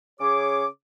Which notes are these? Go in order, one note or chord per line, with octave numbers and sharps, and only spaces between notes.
C#3 C#4 G#4 C#5 D6